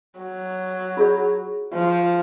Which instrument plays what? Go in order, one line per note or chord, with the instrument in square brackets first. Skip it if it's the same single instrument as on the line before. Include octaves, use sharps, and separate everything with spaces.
[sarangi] F#3
[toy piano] F4 G#4 C#5
[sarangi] F3